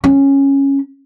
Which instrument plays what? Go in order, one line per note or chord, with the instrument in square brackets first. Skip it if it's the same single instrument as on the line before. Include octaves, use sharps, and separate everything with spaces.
[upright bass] C#4